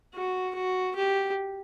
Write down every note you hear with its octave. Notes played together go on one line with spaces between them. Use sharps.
F#4
F#4
G4